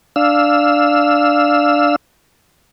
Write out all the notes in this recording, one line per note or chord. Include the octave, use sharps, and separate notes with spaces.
D4 F5 E6